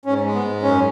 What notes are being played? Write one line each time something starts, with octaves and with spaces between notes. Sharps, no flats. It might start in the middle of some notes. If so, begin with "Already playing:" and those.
G#2 C#4
G#3
B3
G#2
F#2 C#4